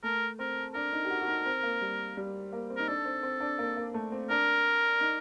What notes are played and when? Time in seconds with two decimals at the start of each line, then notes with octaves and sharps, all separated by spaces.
0.03 A3 A#4
0.39 C4 A#4
0.74 D4 A#4
0.92 D#4
1.05 G4
1.10 F#4
1.21 F#4
1.28 D#4
1.46 C4
1.63 A#3
1.81 G3
2.17 G3
2.53 A#3
2.70 C4
2.76 D#4 A#4
2.88 D4 A4
3.05 C4
3.23 C4
3.40 D4
3.58 A#3
3.76 A#3
3.94 A3
4.12 C4
4.30 D4 A#4
5.01 D#4